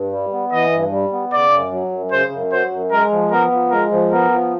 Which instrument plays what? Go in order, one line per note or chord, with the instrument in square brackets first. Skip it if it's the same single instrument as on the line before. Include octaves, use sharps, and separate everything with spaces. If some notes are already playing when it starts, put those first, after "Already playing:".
Already playing: [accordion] G2
G3
B3
[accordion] E3 [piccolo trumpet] D#5
[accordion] G2
G3
B3
[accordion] C#3 [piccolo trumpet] D5
[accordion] F#2
F#3
F#2
[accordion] C#3 [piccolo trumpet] C5
[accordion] F#2
[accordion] F#3 [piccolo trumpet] C5
[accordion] F#2
[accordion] G#3 [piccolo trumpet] A#4
[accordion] F3
[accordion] B3 [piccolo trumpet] A#4
[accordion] F3
[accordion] G#3 [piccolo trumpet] A#4
[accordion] F3
[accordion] B3 [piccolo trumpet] A#4
[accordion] F3